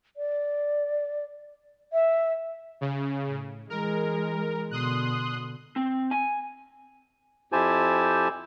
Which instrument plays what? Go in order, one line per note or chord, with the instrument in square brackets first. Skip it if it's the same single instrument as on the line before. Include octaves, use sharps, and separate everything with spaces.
[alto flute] D5
E5
[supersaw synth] C#3
[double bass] A2
[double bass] E3 G#3 [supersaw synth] A#4
[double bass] B2 D3 [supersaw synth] C6 D#6 F#6
[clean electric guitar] C4
G#5
[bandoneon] F2 E4 G4 C5 G#5 A5